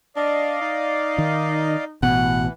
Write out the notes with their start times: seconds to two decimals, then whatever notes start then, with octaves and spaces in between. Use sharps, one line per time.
0.16 D4 D5 D#5 F5
0.61 D#4
1.18 D#3
2.03 A1 B2 E3 F#5